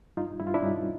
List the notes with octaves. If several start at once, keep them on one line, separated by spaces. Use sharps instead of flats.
G2 D#4 F4
G2 E4
F4
D4 E4
G2 C#4 D#4